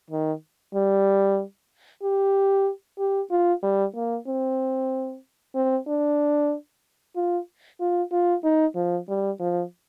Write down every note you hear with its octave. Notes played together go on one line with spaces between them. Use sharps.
D#3
G3
G4
G4
F4
G3
A#3
C4
C4
D4
F4
F4
F4
D#4
F3
G3
F3